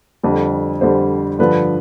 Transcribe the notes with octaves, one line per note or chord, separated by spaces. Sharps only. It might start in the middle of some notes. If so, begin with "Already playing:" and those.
F2 D3 G3
F2 D3 G3 C5
G2 D3 F3 B4